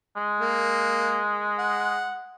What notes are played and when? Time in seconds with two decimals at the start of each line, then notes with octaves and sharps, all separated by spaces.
0.16 G#3
0.40 A#3
1.59 F#5